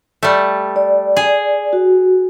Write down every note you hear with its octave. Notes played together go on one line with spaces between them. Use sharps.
G3 A3
D5
G#4
F#4